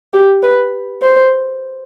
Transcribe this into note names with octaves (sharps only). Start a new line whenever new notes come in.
G4
B4
C5